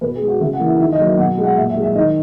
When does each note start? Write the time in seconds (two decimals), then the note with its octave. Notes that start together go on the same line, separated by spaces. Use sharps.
0.01 B2 B4
0.15 G#4
0.21 G#3
0.28 F#4
0.40 C#3 E5
0.53 F#5
0.59 E3 A#3
0.66 E5
0.79 D#3 E5
0.92 D#5
0.98 F#3 A#3
1.05 E5
1.18 B2 F#5
1.37 G#3
1.43 F#5
1.56 A#2 E5
1.69 E5
1.76 G#3
1.82 E5
1.95 D#3 D#5